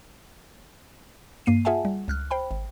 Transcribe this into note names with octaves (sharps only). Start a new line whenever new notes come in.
G2 A#3 C7 D#7
F4 G#4 E5 F#5 G#5 A5
G3
C#2 F6 F#6
C5 G5 B5
G#1